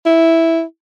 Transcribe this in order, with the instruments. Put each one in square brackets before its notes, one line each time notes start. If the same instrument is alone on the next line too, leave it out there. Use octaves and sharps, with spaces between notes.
[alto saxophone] E4